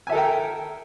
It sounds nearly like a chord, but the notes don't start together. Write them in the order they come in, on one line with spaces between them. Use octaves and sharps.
G#5 E5 A4 A#4 G5